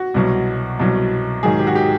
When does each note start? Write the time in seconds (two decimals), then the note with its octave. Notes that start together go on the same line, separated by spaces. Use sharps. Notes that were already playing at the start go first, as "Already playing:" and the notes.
Already playing: F#4
0.14 C2 B2 F#3
0.79 C2 B2 F#3
1.43 G#2 D#3 F#3 G#4
1.59 G4
1.67 F#4
1.75 G4